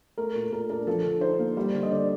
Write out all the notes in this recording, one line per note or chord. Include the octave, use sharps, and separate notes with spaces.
A3 A#4
A#2
A#2 A#4
D4 A#4
F3 A4
D3
D#4 C5
A#3
G3
D3
D#5
D3 D5